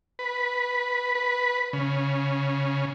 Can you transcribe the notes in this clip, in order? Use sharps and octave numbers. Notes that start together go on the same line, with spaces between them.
B4
B4
C#3